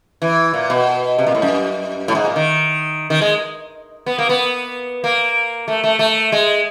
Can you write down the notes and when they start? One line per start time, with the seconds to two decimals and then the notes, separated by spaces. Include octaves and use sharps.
0.22 E3
0.54 A#2
0.70 B2
1.18 C3
1.27 A#2
1.35 A2
1.42 F#2
2.08 A2
2.15 G#2
2.25 A#2
2.36 D#3
3.10 D#3
3.21 G#3
4.06 B3
4.18 A#3
4.29 B3
5.04 A#3
5.68 A3
5.84 A3
5.99 A3
6.32 G#3